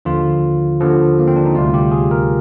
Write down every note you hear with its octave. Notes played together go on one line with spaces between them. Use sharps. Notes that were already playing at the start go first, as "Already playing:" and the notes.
D#2 D3 F3 F4
D#2 D3 F3
A#3
C4
D4
D#4
D2 C3 G3 F4
G4
G#4
A#4